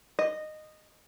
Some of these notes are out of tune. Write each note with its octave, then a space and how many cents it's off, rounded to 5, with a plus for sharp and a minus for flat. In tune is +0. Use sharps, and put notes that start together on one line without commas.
D#5 -15